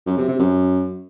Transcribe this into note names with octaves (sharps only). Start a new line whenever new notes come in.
F#2
C3
C3
F#2